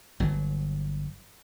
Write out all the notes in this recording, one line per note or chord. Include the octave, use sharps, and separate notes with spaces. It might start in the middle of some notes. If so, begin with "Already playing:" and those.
G1 F#3